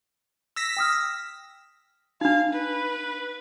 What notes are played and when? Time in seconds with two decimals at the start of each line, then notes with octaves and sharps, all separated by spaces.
0.56 E6 A#6 B6
0.77 G5 D#6 F6
2.21 D4 D#4 F5
2.53 B4